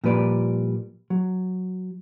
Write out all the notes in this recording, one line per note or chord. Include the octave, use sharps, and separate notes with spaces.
A#2 F3 G3 B4 D5
F#3